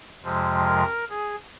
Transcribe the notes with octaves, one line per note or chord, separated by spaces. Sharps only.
F2 C3 F3 G#3
A#4
G#4